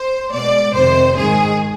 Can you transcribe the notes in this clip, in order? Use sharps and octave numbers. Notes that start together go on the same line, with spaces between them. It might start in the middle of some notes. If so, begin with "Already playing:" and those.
Already playing: C5
B2 G#3 D5
F2 C3 D#3 C5
G#2 D#3 G#3 G#4